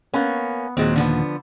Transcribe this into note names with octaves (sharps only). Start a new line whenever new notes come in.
A#3 B3 C#4
D#2 A#2 F#3 G#3 C4
D3 F3 B3